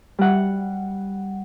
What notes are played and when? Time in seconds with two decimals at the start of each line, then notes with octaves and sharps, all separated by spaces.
0.18 G3 F#5